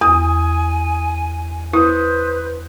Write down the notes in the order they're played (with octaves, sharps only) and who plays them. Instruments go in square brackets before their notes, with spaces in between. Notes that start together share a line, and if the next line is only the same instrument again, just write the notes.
[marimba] E2 [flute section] G#5 [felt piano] D#6
[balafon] E4 [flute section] B4 C5 [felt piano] D#6